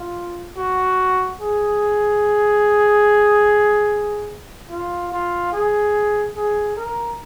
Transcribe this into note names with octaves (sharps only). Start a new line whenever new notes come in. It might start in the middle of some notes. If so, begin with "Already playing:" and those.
Already playing: F4
F#4
G#4
F4
F4
G#4
G#4
A#4